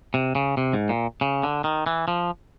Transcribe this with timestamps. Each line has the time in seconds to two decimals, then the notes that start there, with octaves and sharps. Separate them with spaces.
0.14 C3
0.35 C#3
0.57 C3
0.73 G#2
0.89 A#2
1.21 C#3
1.43 D3
1.64 D#3
1.86 E3
2.08 F3